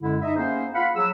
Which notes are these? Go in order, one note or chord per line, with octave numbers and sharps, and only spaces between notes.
F#2 D3 G#3 E4
D#4 D#5 E5
A#3 B3 C#4 G#4 C5
F4 F5 F#5 B5
F#3 G#4 E6